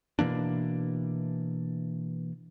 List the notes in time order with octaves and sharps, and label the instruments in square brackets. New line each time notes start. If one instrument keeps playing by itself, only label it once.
[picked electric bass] B2 E3 A#3 D4